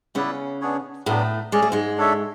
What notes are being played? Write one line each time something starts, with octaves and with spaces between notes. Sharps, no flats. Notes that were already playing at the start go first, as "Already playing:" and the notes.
C#3 B3 C#4 E4 B4 D5
B3 D4 G#4 C#5
A2 F#3 A3 B3 D4
G#3 C#4 G#4 D5
A3
G#2 G#3
D4 A4 C#5 E5